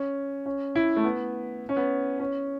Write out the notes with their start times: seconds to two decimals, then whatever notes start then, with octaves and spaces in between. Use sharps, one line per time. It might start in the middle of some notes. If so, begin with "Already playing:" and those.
Already playing: C#4
0.46 C#4
0.75 E4
0.96 A3
1.04 B3
1.69 C#4
1.76 B3
2.19 C#4